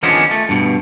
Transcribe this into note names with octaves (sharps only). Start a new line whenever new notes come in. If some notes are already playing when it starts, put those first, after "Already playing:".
D#3 F3 G#3 B3 C#4 D4
A3
G2 B2